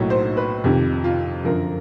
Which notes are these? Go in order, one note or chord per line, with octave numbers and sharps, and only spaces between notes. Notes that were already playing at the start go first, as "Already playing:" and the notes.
Already playing: B1 A2 F#3 A#3 C#5
C5
B4
F2 C3 D#3 G4
F4
F#2 D3 F3 A#4